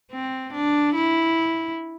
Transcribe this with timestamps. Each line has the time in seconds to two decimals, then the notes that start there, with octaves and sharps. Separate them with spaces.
0.12 C4
0.53 D4
0.95 E4